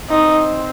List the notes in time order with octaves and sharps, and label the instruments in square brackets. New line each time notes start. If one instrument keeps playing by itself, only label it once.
[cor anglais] C4 [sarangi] D#4